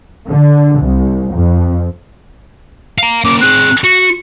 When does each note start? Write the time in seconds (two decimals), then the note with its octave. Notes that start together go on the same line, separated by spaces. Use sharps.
0.28 D3
0.80 C2
1.33 F2
2.98 F5 A#5
3.25 A#3 C#4 D6
3.41 C4 G#4 F#6
3.84 F#4 C#7